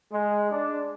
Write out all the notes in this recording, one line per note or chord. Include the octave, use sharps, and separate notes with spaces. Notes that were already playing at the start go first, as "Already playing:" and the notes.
G#3
D4